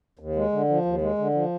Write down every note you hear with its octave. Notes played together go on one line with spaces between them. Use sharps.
D#2
G#3
D3
F3
D#2
G#3
D3
F3